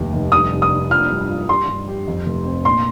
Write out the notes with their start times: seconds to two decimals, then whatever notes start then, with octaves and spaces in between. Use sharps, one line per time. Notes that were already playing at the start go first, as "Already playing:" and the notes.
Already playing: F1 D#2
0.13 F1
0.32 G3 D#6
0.51 C3
0.62 D#6
0.71 C3
0.91 F3 F6
1.10 G2
1.29 F4
1.48 G3 C6
1.68 G2
1.88 G4
2.08 F2
2.26 F1
2.45 C4
2.65 A#2 C6